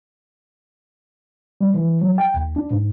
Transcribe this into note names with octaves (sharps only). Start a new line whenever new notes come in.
G3
E3
F#3
G5
D#2
D4
G#2